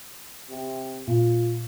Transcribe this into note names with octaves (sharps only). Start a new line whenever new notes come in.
C3
A#2 F4